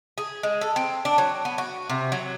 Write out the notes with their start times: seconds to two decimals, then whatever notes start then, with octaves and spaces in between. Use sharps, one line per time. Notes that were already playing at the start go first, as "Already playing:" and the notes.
0.18 G#4
0.43 G#3
0.61 A4
0.76 C4
1.05 D4
1.18 F#3
1.45 B3
1.58 F#4
1.90 C3
2.12 F#3